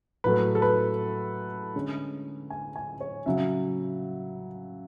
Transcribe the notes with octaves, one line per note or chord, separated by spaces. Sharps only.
A2 F#3 A3 B4
A4
B4
D3 G#3 C#4
G#5
G#5
C#5
C#3 F#3 E5